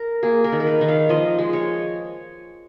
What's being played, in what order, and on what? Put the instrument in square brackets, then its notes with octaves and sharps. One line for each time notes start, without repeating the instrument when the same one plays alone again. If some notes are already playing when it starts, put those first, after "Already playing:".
Already playing: [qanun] A#4
A#3 G#4
A#4
D#3
A#4
B4
D#3
F5
F3 D#5
G#3
C#5